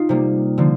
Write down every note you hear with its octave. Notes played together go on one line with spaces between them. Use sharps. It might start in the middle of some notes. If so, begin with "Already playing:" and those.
Already playing: D#4 F4
C3 G3 A#3
D3 F3 A#3